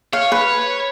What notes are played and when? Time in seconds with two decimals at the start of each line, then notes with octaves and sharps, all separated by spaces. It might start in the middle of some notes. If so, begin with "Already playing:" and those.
0.13 C#5 F5
0.32 B4